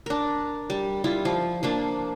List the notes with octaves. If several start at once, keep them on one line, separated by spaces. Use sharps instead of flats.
D4 A#4
G3
G3 E4 F4
F3
F3 A#3 D4